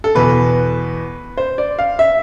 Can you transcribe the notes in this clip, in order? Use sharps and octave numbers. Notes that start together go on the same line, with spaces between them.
A4
E2 B2 B4
C5
D5
F5
E5